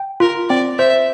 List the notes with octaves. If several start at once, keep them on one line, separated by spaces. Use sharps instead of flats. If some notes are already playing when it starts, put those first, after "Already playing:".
Already playing: G5
F4 A#4
C4 D5
C5 E5